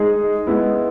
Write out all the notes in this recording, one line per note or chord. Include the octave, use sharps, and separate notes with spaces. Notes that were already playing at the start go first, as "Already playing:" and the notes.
Already playing: G#3 D#4 G#4
G#3 B3 E4